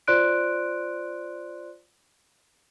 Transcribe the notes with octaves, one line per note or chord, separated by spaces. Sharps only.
F4 C5 D5 C6 F#6 D7